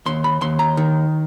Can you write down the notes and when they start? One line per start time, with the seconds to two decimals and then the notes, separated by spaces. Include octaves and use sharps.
0.06 D#2 C6
0.24 B5
0.41 D#2 C6
0.59 A#5
0.77 D#3